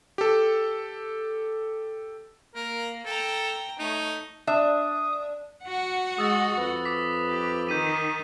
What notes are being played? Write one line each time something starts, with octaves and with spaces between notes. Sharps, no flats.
G4 A4
A#3 A#4
A4 G5 A#5
A3 D#4 C#5
D4 E5 D#6
F#4 F#5
G#3 D#6 E6 A6
F2 B4
D6 B6
G4
D#3 G6 B6 D#7